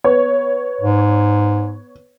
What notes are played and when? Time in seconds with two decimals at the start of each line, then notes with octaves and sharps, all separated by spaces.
0.04 B3 C#5
0.81 G#2